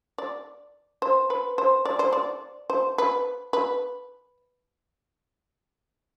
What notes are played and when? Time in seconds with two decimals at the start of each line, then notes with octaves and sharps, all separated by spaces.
0.18 D5
1.02 C5
1.30 B4
1.58 C5
1.85 D5
1.99 C5
2.13 D5
2.70 C5
2.98 B4
3.53 B4